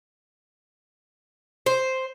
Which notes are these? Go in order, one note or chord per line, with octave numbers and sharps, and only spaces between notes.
C5